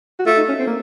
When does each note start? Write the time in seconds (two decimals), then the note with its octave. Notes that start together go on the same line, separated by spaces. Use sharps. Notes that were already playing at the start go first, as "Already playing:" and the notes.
0.19 F#4
0.26 A3 F4
0.37 D#4
0.48 C#4
0.59 C4
0.67 A#3